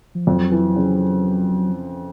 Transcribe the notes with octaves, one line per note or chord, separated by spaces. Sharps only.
F3
F2 F#3
E3
C#3